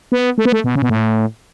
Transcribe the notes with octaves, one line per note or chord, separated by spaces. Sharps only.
B3
A3
B3
A3
B2
C#3
B2
A2